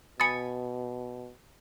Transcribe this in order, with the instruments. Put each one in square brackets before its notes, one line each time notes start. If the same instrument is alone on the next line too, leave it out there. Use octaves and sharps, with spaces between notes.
[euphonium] B2 [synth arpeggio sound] G#5 B5 D#6 [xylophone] A6 C#7